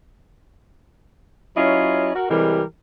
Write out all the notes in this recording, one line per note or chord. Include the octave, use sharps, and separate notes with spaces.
F#3 C#4 E4 F4 C#5 D#5
F#4 A#4
C3 E3 G3 G#3 G4 A#4